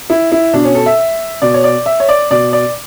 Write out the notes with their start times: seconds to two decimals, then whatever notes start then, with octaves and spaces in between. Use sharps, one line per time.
0.10 E4
0.32 E4
0.53 B2 D4
0.64 C#4
0.75 A4
0.86 E5
1.42 B2 D5
1.54 C#5
1.64 D5
1.86 E5
2.00 C#5
2.09 D5
2.31 B2 D5
2.53 D5